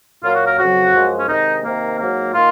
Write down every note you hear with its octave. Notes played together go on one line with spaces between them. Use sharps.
A#2 F#3 A#3 F4
F#4
A#4
F2 C#3 F#3 F#4
F#2 F3 G#3
C#4
C3 D#3 G#3 D#4
C3 D#3 A#3
G#2 F#3 A#3
D#3 A#3 F4